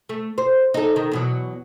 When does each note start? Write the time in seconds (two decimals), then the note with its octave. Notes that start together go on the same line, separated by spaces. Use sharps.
0.09 A3
0.38 C5
0.74 D#4 A4
0.96 D#3
1.12 E2 B2 F#3